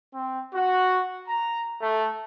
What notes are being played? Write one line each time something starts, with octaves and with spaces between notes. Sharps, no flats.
C4
F#4
A#5
A3